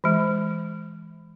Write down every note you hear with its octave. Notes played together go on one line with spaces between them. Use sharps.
E3 G#3